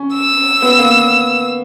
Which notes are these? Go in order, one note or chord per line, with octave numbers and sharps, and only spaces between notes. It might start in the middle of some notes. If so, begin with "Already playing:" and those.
Already playing: C#4
E6
B3
A#3